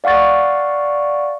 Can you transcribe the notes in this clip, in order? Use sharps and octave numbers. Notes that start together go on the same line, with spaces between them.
D5 F5 F#5 C#6 A6